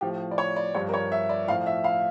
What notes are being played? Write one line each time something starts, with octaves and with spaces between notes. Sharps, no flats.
A2 F3 G4
D5
C#5
D5
G2 F3 C#5
A#4
C#5
E5
D5
A2 F3 F5
E5
F5